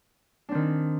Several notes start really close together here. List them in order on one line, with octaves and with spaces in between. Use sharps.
D4 C4 D#3